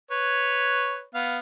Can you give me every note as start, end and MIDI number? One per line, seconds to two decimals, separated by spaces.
0.11 1.04 71
0.11 1.04 73
1.15 1.39 59
1.15 1.39 77